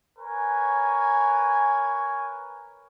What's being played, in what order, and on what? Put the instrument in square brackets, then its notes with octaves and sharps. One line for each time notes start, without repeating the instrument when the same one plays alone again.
[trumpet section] A#4 B4 C#5 G#5